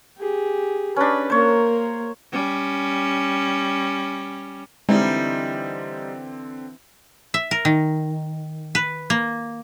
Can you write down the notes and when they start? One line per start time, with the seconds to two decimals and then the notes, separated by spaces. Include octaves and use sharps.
0.18 G4 G#4
0.96 C#4 D4 B4
1.30 A#3 A#4 C5 C#5
2.32 G3 C#4
4.89 D3 E3 G3 G#3 C4 D#4
7.34 E5
7.51 A#4
7.65 D#3
8.75 B4
9.10 A#3